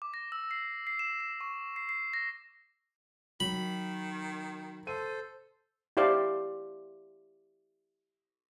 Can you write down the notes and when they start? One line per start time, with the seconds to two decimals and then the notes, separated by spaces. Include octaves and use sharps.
0.02 D6
0.14 A#6
0.32 E6
0.51 C7
0.87 C7
0.99 E7
1.20 E7
1.41 C#6
1.76 C7
1.89 C7
2.14 A#6
3.40 D#3 F#3 B5
4.87 A4 C5 D#7
5.97 E4 G4 C5 D5 F5